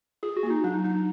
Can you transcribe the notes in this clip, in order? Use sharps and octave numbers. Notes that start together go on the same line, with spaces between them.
F4 G#4
F#4
A#3
D#4
F#3 D4
D#4
F#3 D#4
D#4